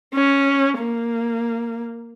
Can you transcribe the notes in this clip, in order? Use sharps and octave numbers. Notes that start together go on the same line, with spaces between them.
C#4
A#3